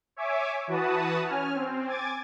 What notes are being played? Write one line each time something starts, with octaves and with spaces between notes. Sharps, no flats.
C#5 E5 G#5 D6
E3 F#4 B4 A5 D#6
C#4 G#5 F6
C4
G#5 D6 G#6 A6